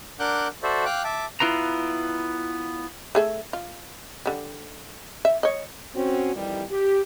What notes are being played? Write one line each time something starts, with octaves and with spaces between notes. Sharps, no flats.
D4 A#4 F#5 D6 F#6 G6
F#4 A4 C5 D5 E5
F5 G5 D6 F#6
E5 A5 D6
B3 E4 F4 B4 A#5
A3 G#4 A4
F4
D3 G3
E5
C#5 D#5
C4 C#4 F#4
F2 D#3 E3 G3 E4 G4
G4